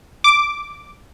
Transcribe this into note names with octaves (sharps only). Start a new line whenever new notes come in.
D6